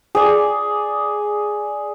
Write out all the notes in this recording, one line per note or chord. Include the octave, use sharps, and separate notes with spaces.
G#4 D5